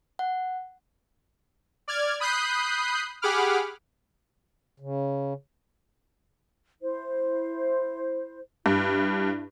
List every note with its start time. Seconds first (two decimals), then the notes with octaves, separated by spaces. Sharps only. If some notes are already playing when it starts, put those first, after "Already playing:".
0.19 F#5
1.88 D5 F6 G#6
2.20 B5 D#6 F#6 G6 C7
3.22 G4 G#4 F#5 B5 D6 F6
4.80 C#3
6.82 E4 C5
8.66 G2 D4 E4